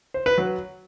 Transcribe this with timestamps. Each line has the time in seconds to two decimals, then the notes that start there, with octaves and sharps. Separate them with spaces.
0.14 C5
0.26 B4
0.38 F#3